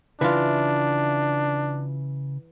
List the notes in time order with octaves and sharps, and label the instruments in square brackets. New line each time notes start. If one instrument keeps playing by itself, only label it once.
[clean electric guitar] C#3 E5 [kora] E3 F4 [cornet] D4